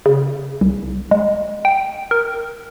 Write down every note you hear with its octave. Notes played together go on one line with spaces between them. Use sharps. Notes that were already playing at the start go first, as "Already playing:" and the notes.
C#3
C2
G#3
G5
A#4